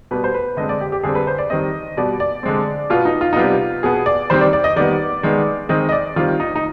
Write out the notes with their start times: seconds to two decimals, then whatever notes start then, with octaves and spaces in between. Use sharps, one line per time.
0.11 B2 G3 B3 B4
0.24 C5
0.34 B4
0.57 D3 G#3 C4 D#5
0.69 D5
0.81 G4
0.92 G4
1.03 D3 G3 C4 G#4
1.15 B4
1.27 C5
1.38 D5
1.50 D#3 G3 C4 D#5
1.97 B2 G3 B3 D5
2.20 D5
2.43 D3 G#3 C4
2.90 B2 B3 F4
3.05 D#4
3.21 F4
3.33 D#4
3.36 C3 G3 B3 F4
3.83 B2 B3 G#4
4.06 D5
4.30 D#3 G3 C4 C5
4.41 D5
4.53 D5
4.64 D#5
4.76 D#3 G3 B3 D5
5.23 D#3 G#3 B3
5.69 D#3 G#3 C4 D#5
5.89 D#5
5.92 D5
6.16 D#3 G3 C4 F4
6.40 D#4
6.56 D#4